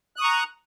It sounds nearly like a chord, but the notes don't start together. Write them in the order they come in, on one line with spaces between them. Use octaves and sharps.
F#6 D#6 C#6 A#5